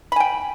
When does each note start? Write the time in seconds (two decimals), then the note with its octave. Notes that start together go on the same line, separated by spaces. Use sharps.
0.12 B5
0.16 G#5
0.20 G5